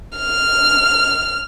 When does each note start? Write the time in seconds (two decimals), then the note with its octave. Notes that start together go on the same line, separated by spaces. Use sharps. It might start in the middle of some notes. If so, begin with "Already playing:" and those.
0.19 F6